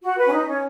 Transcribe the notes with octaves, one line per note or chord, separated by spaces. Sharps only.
F#4
B4
C#4
D#4
C#4